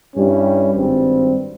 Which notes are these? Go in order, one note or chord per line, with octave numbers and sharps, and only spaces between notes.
G2 G3 C#4 E4 G4
G#1 G2 G3 C4